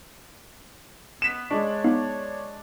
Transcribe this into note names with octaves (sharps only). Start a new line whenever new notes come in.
B3 B6 E7
G#3 D4 C#5
B3 D#4 F5